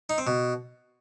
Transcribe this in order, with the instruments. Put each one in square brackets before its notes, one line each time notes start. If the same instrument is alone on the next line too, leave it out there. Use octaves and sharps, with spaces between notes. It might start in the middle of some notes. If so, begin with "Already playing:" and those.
[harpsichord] D#4
C4
B2